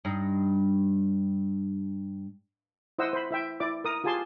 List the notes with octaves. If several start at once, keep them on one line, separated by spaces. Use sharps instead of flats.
G2 D#4
E4 C5 D#5 F#5 E6
C5 B5
E4 E5 G5
E4 D5 D6
A#4 D#6
F4 G4 G#4 G#5 A5 C6